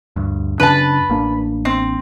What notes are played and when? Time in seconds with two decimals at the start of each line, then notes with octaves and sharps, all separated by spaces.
0.16 D2 G2
0.60 F#2 C#3 D4 B4 A5
1.09 A1 A#3 D4
1.65 C4